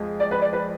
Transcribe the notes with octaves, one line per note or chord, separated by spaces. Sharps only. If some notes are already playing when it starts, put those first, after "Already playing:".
Already playing: F2 F3 G#3
D5
B4
D5
B4